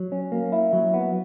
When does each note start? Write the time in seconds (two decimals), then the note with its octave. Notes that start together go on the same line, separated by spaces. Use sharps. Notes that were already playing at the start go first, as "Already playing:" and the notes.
Already playing: F#3
0.12 C#4
0.32 A#3
0.52 E4
0.73 F#3
0.94 B3